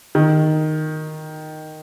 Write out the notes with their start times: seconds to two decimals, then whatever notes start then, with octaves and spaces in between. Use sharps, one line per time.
0.15 D#3